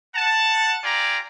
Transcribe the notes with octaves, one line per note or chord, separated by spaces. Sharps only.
F#5 A5
F4 G4 D5 G#5 A#5